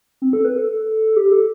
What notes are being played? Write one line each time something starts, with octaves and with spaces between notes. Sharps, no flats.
C4
A4
B4
A4
A4
G4
A4